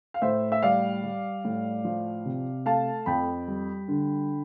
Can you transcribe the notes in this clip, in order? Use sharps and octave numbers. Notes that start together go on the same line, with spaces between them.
F5
A2 C5 E5
E5
G3 D5 F5
G3
A2
F3
C3
A3 F5 A5
F2 G5 B5
G3
D3